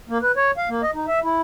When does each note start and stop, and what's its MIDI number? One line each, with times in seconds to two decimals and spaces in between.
0.09 0.18 58
0.23 0.32 71
0.37 0.51 73
0.57 0.69 77
0.69 0.82 58
0.83 0.91 75
0.95 1.06 63
1.07 1.19 76
1.23 1.41 64